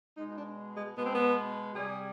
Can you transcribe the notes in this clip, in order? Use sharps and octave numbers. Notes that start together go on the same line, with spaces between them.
B2 G#3 D#4
D#4
D4
G#3
B2 G#3 B3
C4
B3
C3 G3 G#4